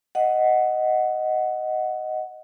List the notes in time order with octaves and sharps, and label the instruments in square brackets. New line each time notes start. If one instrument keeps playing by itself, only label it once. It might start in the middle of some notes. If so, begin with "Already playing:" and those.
[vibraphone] D#5 F#5